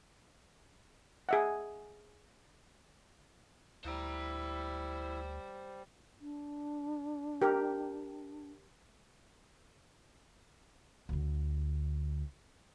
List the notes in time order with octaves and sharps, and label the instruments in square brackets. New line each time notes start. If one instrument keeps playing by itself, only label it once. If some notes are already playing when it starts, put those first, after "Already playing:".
[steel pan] G#4 E5 F#5
[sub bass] D2 [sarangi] G3 [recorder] E4 [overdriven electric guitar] C5 A#5
[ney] D4
[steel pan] G4 A#4
[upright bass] D2 D3